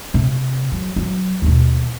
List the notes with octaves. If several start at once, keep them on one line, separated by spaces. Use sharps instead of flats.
C3
F#3
F#3
D#2 B2